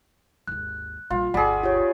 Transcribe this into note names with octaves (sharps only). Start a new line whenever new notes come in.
G#1 D#2 F#6
A#1 G3 F4
G1 D2 G3 G#4 F#5
F4 G4 C#5